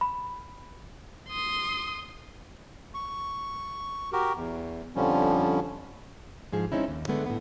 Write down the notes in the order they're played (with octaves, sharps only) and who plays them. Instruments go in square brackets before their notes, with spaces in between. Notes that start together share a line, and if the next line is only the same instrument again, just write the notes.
[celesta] B5
[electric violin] C6 D#6
[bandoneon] C#6
F#4 G4 A#4
E2
F2 D3 F3 G3 C#4
[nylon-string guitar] G#2 F3 G#4
G#3 C4 C#4 D#4 E4
D#2
D3 G#3 A3 B3 D4
A2 B3